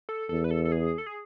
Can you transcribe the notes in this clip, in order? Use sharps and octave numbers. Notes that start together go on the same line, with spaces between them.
A4
E2 A4
B4
A4
A4
G#4
A4
G#4